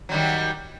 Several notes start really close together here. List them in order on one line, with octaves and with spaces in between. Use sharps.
F#3 G3 D#3